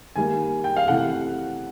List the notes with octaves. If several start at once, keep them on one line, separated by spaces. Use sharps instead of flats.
D#3 G3 A#3 G#5
G5
F5
C3 E3 A3 F#5